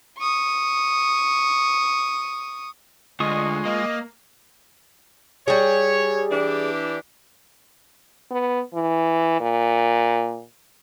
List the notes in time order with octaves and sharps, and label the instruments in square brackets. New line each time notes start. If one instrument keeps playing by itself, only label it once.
[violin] C#6 D#6
[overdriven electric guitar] D2 [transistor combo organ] G#3 [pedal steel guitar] F4 C#6 D#6 [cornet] D#5
[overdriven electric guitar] A#3 [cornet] D#5
[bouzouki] G3 G#4 [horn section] C#5
[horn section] E3 D4 G4
[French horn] B3
E3
A#2